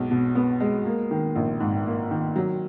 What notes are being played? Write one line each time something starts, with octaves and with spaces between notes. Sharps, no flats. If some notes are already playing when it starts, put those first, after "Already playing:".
Already playing: B1 G#3 B3
B2
B3
G#3
A#3
D#3
A#1
G#2
A#3
D#3
F#3